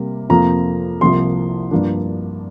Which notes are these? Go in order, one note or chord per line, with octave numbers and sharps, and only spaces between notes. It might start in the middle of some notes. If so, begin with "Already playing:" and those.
Already playing: C3 G3 A#3
F2 C3 F3 A#3 A#5
C2 C3 F3 A#3 C6
G2 F3 A#3 D4